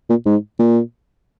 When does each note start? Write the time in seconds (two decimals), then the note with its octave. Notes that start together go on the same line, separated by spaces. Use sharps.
0.09 A#2
0.26 G#2
0.59 A#2